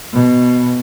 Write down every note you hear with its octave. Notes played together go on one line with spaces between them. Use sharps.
B2